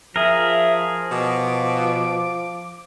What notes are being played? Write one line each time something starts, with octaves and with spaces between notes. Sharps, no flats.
F3 G#4 A#4 E5
B2 D6